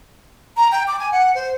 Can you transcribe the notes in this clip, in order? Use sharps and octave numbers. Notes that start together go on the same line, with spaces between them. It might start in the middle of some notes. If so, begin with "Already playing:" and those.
A#5
G5
D6
G#5
F#5
C5